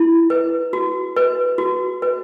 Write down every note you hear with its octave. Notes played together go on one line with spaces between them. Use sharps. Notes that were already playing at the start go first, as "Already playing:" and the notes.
Already playing: E4
B4
F#4
B4
F#4
B4